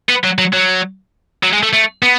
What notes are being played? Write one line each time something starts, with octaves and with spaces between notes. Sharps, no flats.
B3
F#3
F#3
F#3
F#3
G#3
A3
A3
B3